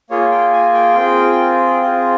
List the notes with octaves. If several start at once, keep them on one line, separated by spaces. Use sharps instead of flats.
A#3 F4 G#4 C#5
G5
G#5
G5
C4 F4 G#4
C4 F4 G#4